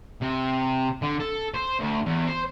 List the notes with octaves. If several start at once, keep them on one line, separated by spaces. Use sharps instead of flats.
C3
D3
A4
C5
D2
E2
C5